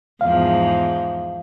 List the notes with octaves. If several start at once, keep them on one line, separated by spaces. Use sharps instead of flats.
E2 G#2 F3 F5